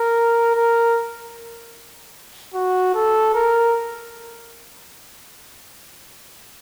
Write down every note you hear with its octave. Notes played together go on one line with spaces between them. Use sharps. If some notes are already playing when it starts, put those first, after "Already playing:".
Already playing: A#4
A#4
F#4
A4
A#4